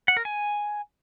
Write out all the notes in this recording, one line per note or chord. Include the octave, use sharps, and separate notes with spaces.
F#5
A#4
G#5